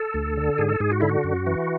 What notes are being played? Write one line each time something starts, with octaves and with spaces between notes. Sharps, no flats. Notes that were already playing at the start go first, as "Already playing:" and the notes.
Already playing: A4
D2
D3
G#2 G#4
A4
G#2 G#4
F#4
D3 E4
F#4
F#2
E3